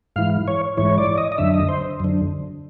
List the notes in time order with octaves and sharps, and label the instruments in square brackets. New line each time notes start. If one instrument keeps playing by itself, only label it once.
[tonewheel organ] G#2 E3 F5
C#5
G#2 E3 C#5
D5
D#5
D#5
F#2 D3 E5
D#5
C5
F#2 D3